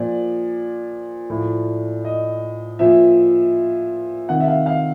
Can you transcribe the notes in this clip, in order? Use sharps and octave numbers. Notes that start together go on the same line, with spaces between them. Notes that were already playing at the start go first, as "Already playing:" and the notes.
Already playing: A#2 F3 D5
A2 F3
D#5
A#2 F3 E5
C3 D#3 F#5
E5
F5
F5